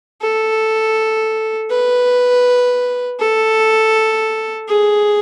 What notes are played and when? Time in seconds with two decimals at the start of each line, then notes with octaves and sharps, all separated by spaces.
0.21 A4
1.71 B4
3.19 A4
4.68 G#4